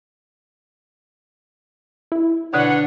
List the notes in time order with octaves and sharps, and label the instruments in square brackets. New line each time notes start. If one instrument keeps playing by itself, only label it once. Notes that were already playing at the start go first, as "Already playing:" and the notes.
[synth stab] E4
[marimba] B2 D3 [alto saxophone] D4 [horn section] B4 C#5 F#5